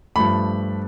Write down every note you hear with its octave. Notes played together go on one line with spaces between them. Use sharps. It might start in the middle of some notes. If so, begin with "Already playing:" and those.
G2 F3 A3 B5